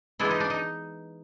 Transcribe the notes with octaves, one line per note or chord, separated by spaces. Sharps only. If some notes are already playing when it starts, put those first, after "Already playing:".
E3 G#3 B3 D4 E4
D#4
D4
D#4